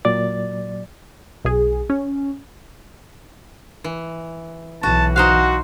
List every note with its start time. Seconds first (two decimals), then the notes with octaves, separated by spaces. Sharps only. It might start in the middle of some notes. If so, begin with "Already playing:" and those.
0.05 A#2 F#3 D5 A6
1.45 B1 G#4
1.90 C#4
3.84 E3
4.83 B1 E3 F#4 A5
5.16 D#4 F#4 C5 F5 F#5